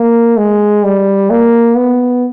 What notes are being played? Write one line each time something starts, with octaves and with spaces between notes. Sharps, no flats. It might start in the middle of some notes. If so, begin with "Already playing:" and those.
Already playing: A#3
G#3
G3
A#3
B3